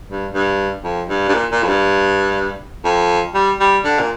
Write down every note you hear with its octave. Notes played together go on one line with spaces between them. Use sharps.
G2
G2
F2
G2
G2
A#2
A#2
F2
G2
F2
G3
G3
D3
A#2